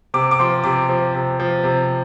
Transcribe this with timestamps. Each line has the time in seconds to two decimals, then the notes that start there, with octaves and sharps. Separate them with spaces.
0.14 C3 D6
0.31 D6
0.39 F3 C6
0.64 C3 D6
0.89 F3
1.14 C3
1.40 F3
1.63 C3